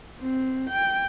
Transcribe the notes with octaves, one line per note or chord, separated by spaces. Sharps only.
C4
G5